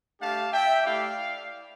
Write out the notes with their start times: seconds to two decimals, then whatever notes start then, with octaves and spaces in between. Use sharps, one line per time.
0.20 A3 D4 G4 F5 A5
0.52 E5 G5
0.84 A3 E4 G4 D5 F5